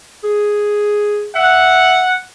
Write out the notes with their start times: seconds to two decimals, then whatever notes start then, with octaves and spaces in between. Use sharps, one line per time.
0.24 G#4
1.35 E5 F#5